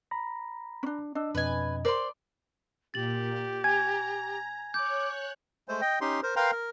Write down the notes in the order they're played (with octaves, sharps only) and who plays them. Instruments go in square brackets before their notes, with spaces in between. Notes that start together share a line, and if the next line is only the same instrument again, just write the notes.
[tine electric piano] A#5 B5 A#6
[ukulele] C#4 D4
[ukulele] D4 [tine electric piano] D#5 E6
[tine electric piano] F2 B2 D#5 [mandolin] B4 G#5
[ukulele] A#4 C5 [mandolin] D5 C6
[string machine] A#2 [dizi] G4 [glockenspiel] A6 F#7
[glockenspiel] G#5 [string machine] A#5 [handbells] G#6
[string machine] C#5 F#6 [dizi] D6 [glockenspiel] G6
[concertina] G#3 A3 C5
D#5 G5
C#4 D#4 G4 C6
A#4 C5
A#4 B4 F5 G5 A#5 C6
A#4